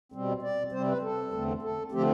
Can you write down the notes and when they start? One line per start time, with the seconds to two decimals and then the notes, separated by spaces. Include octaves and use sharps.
0.12 B2 G3 C4
0.42 D5
0.72 C3 G3 C4 C5
0.87 B4
1.02 A4
1.32 E2 D3 A3 C4
1.62 A4
1.92 D3 F3 A3 C4 G4